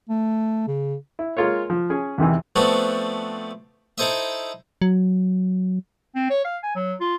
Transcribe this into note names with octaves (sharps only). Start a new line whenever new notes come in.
A3
C#3
E4
G#3 A#3 F4 A#4 C#5
F3
C#4 G#4 G#5
E2 C3 D#3 E3
F3 A3 B3 C4 D4 F#4
D#4 E4 A4 C5 D#5 E5
F#3
C4
C#5
F5
G#5
F#3
F4